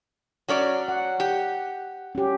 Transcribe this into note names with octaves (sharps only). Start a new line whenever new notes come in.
F#3 C#4 D5
F#5
G4
C#4 G4